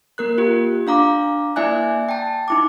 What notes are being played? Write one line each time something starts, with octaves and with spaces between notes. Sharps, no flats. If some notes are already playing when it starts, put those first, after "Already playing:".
A#3 A#4 F#6
F4 G4
D4 F5 A#5 D6
A#3 E4 D5 E5 G#5 F#6
G5 A5
D#4 E4 D6